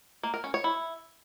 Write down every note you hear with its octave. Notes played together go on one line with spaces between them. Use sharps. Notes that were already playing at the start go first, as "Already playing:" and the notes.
A#3
A#4
C#4
C#5
E4